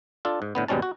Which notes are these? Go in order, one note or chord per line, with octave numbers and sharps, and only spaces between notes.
D4 F4 A4
G#2
A2 D3 B3
D#2 G#2 B2 G3 C#4 A5
F#4